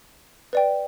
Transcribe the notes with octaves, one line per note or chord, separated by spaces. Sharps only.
B4 D5 G5